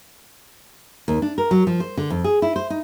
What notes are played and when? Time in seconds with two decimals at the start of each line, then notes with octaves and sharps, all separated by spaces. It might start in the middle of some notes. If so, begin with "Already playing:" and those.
1.08 D#2
1.22 D4
1.38 A#4
1.51 F#3
1.67 F3
1.80 C5
1.97 D3
2.10 F2
2.24 G#4
2.42 E4
2.56 C5
2.70 D#4